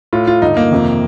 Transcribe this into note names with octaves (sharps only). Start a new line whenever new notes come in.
A2 F4
F4
G2 D3 D#4
A#3
F2 C3 D#3